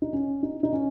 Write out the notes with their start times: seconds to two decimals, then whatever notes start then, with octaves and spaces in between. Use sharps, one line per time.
0.02 D#4
0.13 C#4
0.43 D#4
0.63 D#4
0.73 C#4